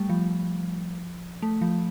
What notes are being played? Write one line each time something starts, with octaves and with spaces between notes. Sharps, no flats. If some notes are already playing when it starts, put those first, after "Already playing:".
Already playing: G3 A3
F3
A3
F3